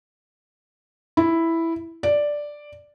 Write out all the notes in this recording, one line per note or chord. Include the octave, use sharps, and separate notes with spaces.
E4
D5